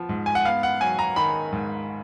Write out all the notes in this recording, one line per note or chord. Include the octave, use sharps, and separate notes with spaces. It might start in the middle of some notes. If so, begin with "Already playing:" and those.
Already playing: F3 B3
G#2
G#5
F#5
B3 F5
F#5
F#3 G#5
A#5
D#3 B5
G#2